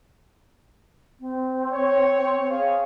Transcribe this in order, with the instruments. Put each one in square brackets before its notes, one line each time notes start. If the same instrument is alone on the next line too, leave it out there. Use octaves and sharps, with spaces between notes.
[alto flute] C4
[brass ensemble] C#5
[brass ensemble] G#4 C#5 [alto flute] F5